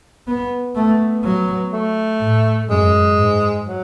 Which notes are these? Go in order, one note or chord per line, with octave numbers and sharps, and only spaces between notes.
B3
A3 B3
F#3
A3
A2
F#2 G#3
G#2
F#3